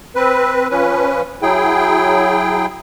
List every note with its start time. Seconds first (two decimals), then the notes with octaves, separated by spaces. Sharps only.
0.16 C4 B4
0.71 F3 C#4 B4
1.42 F#3 E4 G#4 G5